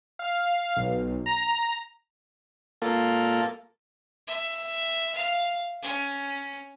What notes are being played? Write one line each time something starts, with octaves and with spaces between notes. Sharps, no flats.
F5
B1
A#5
A#3 F4 A4
E5
F5
C#4